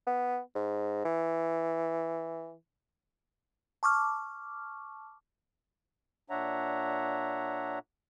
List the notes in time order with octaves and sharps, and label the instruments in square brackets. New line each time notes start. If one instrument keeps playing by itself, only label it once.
[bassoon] B3
G#2
E3
[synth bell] A5 C#6 D6 F6
[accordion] A#2 D4 C#5 E5 F#5 A#5